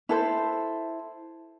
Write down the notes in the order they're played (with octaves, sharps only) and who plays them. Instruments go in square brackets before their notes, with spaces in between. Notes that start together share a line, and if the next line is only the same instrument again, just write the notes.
[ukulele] E4 A4 C5